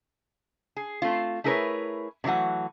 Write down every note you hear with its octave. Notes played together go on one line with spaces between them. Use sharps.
G#4
A3 C4 F4
A3 E4 G#4 A#4 B4 C#5
C3 E3 F#3 A3 F#5